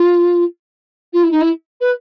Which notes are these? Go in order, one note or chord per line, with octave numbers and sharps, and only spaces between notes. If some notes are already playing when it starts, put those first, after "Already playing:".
Already playing: F4
F4
E4
D#4
E4
B4